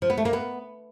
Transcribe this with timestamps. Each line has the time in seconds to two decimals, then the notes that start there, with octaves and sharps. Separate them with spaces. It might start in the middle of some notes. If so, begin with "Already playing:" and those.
0.02 F3
0.10 B3
0.17 A3
0.25 A#3
0.33 B3